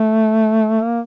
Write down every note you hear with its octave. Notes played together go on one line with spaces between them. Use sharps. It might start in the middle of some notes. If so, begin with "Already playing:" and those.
Already playing: A3
A#3